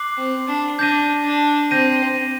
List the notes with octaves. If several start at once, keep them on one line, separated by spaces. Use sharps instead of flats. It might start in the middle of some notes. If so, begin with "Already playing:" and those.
Already playing: D6 F#6 C7 F#7
C4
D4
D4 G6 A#6 D#7
D4
C4 G6 A#6 D#7